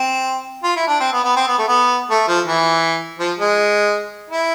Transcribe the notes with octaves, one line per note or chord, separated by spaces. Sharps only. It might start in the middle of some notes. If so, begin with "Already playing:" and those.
Already playing: C4
F4
E4
D4
C4
B3
B3
C4
B3
A3
B3
A3
F3
E3
F3
G#3
E4